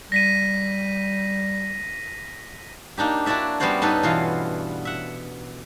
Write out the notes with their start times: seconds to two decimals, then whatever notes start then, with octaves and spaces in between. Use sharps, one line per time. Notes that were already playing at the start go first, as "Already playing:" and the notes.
0.12 G3 A#6 B6 D#7
2.97 A#3 D4 D#4 G4
3.26 D4 E4 F#4 D5 E5
3.60 G3 B3 C#4 F#4 C5 D5
3.82 G2 D#4 A4 B4 G#5
4.03 B2 E3 F4 F5
4.85 E5 F#5